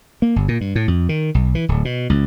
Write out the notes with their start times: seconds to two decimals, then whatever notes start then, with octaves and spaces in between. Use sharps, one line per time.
0.22 A#3
0.36 G1
0.48 A#2
0.61 G2
0.75 A2
0.88 F2
1.09 D#3
1.35 B1
1.55 E3
1.69 D1
1.85 B2
2.10 C#2